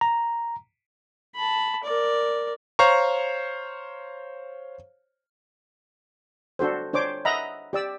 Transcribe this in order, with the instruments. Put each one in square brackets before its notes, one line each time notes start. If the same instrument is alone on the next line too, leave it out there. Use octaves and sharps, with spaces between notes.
[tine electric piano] A#5
[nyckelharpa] A5 B5
A#4 D5
[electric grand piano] C5 C#5 F5 A#5 C#6
[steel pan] D4 F#4 A4 C5
D4 C5 C#5 D6
D#5 E5 F#5 A#5 B5
G4 D5 E6